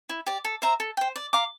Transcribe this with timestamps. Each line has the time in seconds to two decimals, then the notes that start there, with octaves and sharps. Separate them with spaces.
0.09 E4
0.26 G4 D5
0.45 A4
0.62 C5 E5 A#5
0.80 A4
0.97 C5 G5
1.16 D5
1.33 F5 A#5 D6